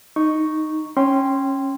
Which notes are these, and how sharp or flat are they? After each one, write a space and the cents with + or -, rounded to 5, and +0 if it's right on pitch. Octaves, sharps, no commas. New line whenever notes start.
D#4 -5 C#6 +0
C#4 -15 G5 +0 C6 +0